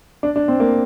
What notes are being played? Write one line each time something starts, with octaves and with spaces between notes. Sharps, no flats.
D4
D4
C4
A#3